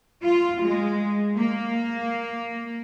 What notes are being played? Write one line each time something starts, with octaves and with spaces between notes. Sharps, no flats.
F4
G#3
A#3